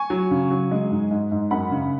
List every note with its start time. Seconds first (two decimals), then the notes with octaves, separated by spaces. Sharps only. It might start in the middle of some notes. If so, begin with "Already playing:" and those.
Already playing: G#5 C#6
0.10 F#3
0.31 C#3
0.51 F#3
0.71 G#3
0.91 G#2
1.11 G#2
1.32 G#2
1.51 F#2 F#5 B5
1.71 C#3